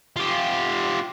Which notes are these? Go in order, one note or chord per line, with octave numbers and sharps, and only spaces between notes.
F4 G4